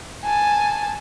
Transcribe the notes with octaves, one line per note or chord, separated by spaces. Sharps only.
G#5 A5